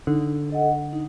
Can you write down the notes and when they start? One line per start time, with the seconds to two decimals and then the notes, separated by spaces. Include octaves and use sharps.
0.07 D3 D#4
0.50 A4 D#5 F#5
0.93 D#4